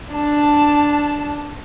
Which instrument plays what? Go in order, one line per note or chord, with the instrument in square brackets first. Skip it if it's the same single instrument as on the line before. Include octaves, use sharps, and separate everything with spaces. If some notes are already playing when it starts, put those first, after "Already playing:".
[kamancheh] D4 A5